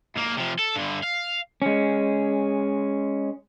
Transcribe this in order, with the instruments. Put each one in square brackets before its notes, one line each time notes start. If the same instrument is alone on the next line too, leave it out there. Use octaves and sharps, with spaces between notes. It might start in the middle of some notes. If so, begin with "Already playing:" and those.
[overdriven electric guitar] G#2 A#3
C3 F3
A4
G2 D3
F5
[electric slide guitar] G#3 C#4